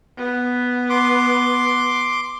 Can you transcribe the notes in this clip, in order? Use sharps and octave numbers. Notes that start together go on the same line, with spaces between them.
B3
C6 D6